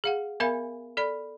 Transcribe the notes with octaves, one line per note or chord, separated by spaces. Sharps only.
G#4 F5 F#5
B3 A#4 E5 F5 G#5 B5
A4 D5 B5